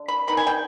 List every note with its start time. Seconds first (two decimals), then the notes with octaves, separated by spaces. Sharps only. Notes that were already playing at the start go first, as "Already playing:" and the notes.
Already playing: D3 D4
0.08 B5
0.28 D#3 B3 D#4 B5
0.37 G#5
0.47 G5